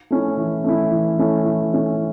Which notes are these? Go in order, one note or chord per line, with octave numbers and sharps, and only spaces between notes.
A3 C#4 E4
E3
A3 C#4 E4
E3
A3 C#4 E4
E3
A3 C#4 E4